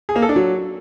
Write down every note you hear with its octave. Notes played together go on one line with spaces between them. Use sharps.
G#4
A#3
A4
D4
F#3